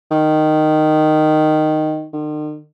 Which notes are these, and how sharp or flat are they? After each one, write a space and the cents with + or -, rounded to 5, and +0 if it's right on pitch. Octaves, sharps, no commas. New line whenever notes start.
D#3 -10
D#3 -45